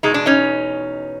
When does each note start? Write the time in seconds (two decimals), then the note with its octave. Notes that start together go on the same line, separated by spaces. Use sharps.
0.03 E2 B2 G#3 D#4
0.14 D4
0.26 C#4 D#4